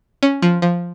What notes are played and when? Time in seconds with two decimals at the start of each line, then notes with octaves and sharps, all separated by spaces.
0.23 C#4
0.42 F3
0.62 F3